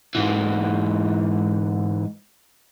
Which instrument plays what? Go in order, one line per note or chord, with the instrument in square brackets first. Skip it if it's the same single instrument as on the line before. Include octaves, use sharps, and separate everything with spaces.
[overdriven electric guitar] G#2 E3